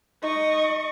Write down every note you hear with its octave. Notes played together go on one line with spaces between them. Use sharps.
D#4 D#5 C#6